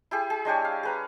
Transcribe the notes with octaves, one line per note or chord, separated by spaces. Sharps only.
E4 G4 G#4
G#4
G#3 D4 G4 C#5
F5
G#4 B4 A#5